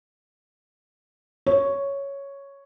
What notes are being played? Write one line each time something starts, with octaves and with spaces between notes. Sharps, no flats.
C#5